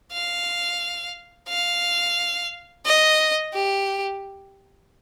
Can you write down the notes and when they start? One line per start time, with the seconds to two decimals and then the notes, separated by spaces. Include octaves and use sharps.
0.13 F5
1.49 F5
2.86 D#5
3.54 G4